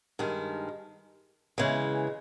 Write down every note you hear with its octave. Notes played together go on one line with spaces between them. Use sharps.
G2 D#3 G#3
C#3 E3 G#3